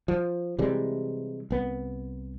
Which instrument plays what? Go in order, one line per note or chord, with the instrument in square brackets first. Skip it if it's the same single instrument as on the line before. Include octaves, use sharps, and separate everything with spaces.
[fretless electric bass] F3
C3 E3 G3 G#3
C2 B3